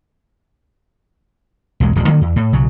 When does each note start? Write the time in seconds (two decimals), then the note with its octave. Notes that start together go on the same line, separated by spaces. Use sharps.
1.80 B1 E2 G#3
1.96 D#1 A#1 B2
2.07 D3 D#3 F#3 A#3
2.21 E2
2.36 A2
2.53 B1 C#3 F#3